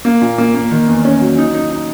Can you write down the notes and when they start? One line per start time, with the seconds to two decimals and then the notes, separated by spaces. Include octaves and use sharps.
0.05 A#3
0.21 A#2
0.38 A#3
0.55 A#3
0.71 D#3
0.88 E2
1.05 C#4
1.21 F#3
1.38 D#4
1.55 D#4
1.71 D#4